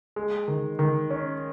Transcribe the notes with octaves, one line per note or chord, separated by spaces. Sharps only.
G#3
D#3
D#3
C#4